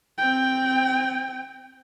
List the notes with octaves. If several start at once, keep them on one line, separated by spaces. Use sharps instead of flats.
C4 G5